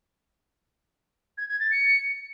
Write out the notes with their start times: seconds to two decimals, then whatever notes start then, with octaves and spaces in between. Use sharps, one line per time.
1.37 G#6
1.49 G#6
1.60 A6
1.71 C#7